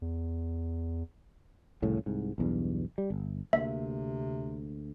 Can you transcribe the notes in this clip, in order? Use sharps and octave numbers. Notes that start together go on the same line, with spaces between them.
E2
C2 F2 A2 C#3
C2 G#2
B1 E2 G2
G3
G1
D2 C3 A#3 E5